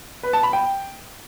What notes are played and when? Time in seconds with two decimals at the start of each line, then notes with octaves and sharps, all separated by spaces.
0.23 B4
0.33 A5
0.43 B5
0.53 G5